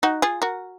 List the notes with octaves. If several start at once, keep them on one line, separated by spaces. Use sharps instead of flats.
D#4 F#4
F4 G#4
F#4 A#4